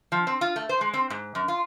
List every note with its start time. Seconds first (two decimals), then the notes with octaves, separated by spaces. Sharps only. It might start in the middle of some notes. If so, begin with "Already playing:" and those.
0.12 F3
0.27 C4
0.41 F4
0.56 A3
0.69 C5
0.81 G#3
0.94 C4
1.10 G#2
1.35 F#2
1.48 F4